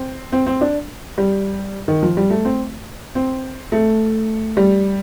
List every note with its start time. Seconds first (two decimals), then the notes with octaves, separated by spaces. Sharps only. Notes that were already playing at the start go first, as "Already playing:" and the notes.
Already playing: C4
0.32 C4
0.47 C4
0.61 D4
1.18 G3
1.88 D#3
2.02 F3
2.17 G3
2.30 A3
2.45 C4
3.15 C4
3.72 A3
4.57 G3